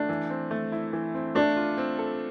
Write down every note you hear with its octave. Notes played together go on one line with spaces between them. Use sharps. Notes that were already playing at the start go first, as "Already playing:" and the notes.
Already playing: A3 D4
E3
C4
A3
E4
E3
C4
A3 D4
F4
C4
A4